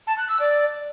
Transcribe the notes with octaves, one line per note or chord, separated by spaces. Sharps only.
A5
F#6
E6
D5